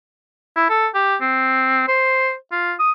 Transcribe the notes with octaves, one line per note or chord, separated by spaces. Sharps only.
E4
A4
G4
C4
C5
F4
D#6